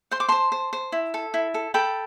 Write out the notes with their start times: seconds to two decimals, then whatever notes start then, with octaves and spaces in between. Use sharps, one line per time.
0.11 C5 C6
0.20 D6
0.29 C5 A5 C6
0.52 C5
0.73 C5
0.92 E4
1.14 A4
1.34 E4
1.54 A4
1.74 A4 G5 B5